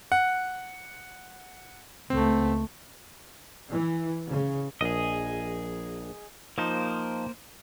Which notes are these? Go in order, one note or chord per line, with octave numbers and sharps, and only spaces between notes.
F#5
C#2 A3 C4
E3
C#3
A#1 G#4 D#5
F3 A#3 D#4 C5